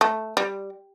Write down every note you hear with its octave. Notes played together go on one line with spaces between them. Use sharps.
A3
G3